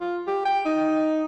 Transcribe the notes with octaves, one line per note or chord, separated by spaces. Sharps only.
F4
G4
G5
D#4